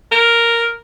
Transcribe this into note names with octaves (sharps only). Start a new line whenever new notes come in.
A#4